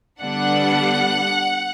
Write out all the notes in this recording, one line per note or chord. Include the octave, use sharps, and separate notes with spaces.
D3 G3 B3 D4 F#5